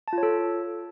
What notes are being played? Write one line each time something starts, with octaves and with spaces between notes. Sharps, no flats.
A5
F4
C#5
A4